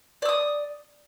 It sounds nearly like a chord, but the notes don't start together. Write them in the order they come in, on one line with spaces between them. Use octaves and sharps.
D5 E6 D#6